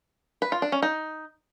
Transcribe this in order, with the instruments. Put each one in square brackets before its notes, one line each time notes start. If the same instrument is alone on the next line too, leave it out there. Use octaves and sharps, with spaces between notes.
[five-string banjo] B4
F4
D4
C#4
D#4